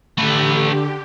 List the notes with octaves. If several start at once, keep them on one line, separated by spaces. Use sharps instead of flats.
D3 A3 G4 B4